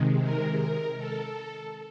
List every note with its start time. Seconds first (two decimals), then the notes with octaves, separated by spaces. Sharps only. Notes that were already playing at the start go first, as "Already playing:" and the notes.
Already playing: C3 D#3 G#3
0.22 A#4
0.60 A#4
0.98 A4